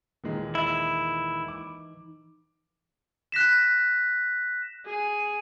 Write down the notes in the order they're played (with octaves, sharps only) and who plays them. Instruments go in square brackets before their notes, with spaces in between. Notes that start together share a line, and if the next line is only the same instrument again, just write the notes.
[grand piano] D#2 A#2 G#3 [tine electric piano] E3 D#4
[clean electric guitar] E4
[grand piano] D6
[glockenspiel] F#6 A#6 B6 E7
[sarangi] G#4